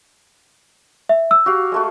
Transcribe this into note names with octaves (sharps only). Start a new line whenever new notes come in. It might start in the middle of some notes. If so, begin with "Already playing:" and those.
E5
E6
F#4 G4 F5
G#3 A3 F#4